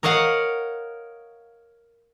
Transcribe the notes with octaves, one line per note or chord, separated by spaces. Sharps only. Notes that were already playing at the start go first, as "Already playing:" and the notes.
A#4 C#5 D#5 F5 F#5